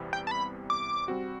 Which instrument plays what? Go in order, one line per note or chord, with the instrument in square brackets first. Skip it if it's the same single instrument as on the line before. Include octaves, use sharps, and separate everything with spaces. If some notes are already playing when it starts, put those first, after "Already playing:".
Already playing: [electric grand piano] E2 C3 E3 G3 B3
[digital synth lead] G5
A5
B5
D6
[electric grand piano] G3 C4 F#4